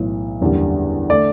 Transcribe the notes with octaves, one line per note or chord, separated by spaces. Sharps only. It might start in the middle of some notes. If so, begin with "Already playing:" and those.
Already playing: B1 A2 E3
F#1 E2 D3 G3
D3 A3 D5